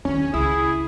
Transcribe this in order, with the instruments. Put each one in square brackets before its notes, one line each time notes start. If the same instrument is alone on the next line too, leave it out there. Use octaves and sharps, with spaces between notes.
[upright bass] D#2 D3 [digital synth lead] C#4
[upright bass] C#2 [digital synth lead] E4 [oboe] G#4